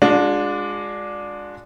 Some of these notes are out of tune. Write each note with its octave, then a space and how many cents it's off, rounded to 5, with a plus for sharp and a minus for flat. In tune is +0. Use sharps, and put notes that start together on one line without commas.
G#3 -5 D4 +0 F4 +45